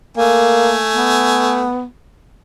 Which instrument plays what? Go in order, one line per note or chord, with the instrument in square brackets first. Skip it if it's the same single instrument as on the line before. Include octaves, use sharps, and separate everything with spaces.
[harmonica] A3 G#5 [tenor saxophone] A#3
[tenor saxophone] B3